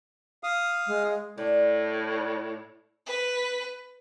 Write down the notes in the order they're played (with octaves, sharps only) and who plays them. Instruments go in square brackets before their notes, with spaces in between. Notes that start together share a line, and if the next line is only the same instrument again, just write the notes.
[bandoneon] F5 D#6
[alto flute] G#3
[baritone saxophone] A2 [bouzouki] D4
[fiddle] B4